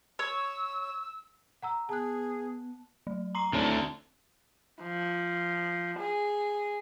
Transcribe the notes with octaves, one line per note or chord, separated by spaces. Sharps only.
C#5 E6
F#5 A#5 E6
B3 G#4 A5 F#6
F#3
A#5 C6 C7
D2 D3 C4 E4 C#5
F3
G#4